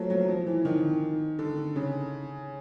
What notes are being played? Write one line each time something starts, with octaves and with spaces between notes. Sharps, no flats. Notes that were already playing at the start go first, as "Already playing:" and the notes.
Already playing: F3 F#3 A3 A#3
F#3
F3
E3
D#3
D3
C#3